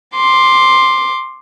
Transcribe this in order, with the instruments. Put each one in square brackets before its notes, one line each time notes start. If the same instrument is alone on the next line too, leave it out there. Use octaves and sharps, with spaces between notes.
[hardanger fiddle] C6 D6